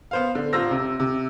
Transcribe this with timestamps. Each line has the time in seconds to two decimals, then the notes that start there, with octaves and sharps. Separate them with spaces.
0.11 B3 C5 F5
0.35 D3
0.53 D#1 F4 C5 E6 A#6
0.71 C3
1.00 C3